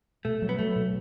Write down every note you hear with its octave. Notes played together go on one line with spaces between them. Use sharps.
B2 A3
F#3
B3
F#3 A3
B2